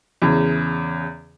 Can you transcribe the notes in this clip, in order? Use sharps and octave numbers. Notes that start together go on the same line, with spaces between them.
E2 C#3